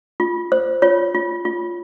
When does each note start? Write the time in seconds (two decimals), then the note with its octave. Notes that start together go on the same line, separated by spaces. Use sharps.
0.20 F4
0.52 C5
0.82 F4 C#5
1.15 F4
1.45 F4